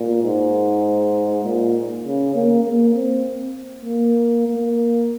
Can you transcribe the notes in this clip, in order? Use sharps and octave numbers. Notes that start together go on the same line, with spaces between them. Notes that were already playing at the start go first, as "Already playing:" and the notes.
Already playing: A#2
G#2
A#2
C#3
A#3
A#3
C4
A#3
A#3